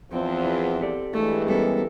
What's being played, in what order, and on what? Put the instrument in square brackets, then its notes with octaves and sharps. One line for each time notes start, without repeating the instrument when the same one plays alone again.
[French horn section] E2 F3 [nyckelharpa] C4
[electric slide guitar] E4
G4 A4 D5
[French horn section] G2 E3 G#3 [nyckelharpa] A3
[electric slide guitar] G3 B3 C#4 [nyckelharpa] A4 A#4